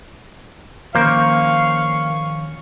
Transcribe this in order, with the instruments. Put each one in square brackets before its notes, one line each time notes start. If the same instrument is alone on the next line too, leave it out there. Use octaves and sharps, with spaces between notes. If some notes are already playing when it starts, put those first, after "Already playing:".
[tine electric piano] D#3 F3 [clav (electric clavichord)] A#3 C5 [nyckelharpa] C#4 C#6 [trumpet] F5